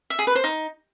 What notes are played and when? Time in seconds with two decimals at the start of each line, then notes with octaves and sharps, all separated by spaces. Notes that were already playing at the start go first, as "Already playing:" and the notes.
0.10 E5
0.19 G#4
0.27 B4
0.35 C5
0.44 D#4